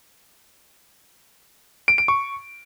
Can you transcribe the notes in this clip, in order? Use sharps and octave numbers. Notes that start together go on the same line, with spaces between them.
D7
D7
C#6